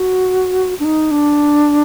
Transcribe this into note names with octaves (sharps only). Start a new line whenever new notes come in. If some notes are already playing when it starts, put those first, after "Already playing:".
Already playing: F#4
D4
D#4
D4